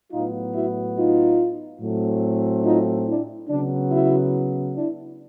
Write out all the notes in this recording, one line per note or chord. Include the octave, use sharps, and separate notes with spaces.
A2 F#3 B3 D#4 F4
E4 F#4
D#4 F4
A2 F#3 A3 C4
D#4 F4
D4 E4
C#3 F#3 B3 D4
E4 F#4
D4 E4